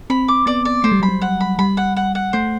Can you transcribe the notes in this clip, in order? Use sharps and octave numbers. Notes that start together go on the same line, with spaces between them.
C4 B5
D6
B3 D5
D5
A3 C5
G3
F#3 B5
G3
F#5
B5
G3 B5
F#5
F#5
F#5
A3 C5